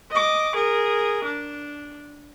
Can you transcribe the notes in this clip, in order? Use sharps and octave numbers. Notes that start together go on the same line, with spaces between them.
D#5 D6
G#4 A#4
D4